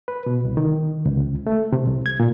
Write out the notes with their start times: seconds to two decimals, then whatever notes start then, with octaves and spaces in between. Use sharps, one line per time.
0.08 B4
0.26 B2
0.45 C2
0.57 D#3
1.06 C#2
1.47 A3
1.72 C3
1.88 C2
2.06 G#6
2.20 A#2